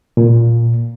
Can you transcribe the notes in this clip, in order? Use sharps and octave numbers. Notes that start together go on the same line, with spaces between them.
A#2